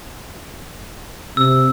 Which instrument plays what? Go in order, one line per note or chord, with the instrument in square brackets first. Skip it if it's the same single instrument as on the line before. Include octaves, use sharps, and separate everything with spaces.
[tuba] C3 [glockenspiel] E6